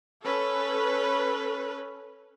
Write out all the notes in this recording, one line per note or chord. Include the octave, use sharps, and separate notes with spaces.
C#4 A4 B4